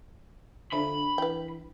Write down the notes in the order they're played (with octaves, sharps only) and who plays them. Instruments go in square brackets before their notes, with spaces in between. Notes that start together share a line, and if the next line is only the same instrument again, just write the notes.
[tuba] D3 [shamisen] F3 [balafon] D4 E5 [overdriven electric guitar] B5
[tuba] E3 [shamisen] B4 G5